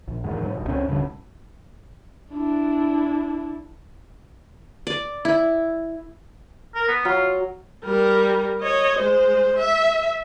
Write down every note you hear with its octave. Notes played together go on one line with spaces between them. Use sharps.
A#1
E2 G#2 D#3
G#2 F#3
D#1 B2
C#2 G2 C4 C#4
D#1 D2 G2 C#3
D4 E4
D5
E4
A#4
B3
F#3 F4
G3 A#4
C#5 D#5
G#3 C5
E5